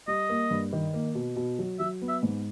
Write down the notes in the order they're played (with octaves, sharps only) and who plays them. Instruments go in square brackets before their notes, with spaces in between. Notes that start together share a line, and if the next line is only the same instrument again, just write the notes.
[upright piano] G3 [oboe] D#5
[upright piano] A#3
G2
D#3
A#3
B2
B2
F#3
[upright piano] F#3 [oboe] E5
[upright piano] B3
[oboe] E5
[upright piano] G#2